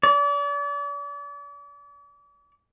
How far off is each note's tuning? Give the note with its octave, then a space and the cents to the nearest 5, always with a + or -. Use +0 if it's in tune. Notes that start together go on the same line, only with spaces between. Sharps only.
D5 -40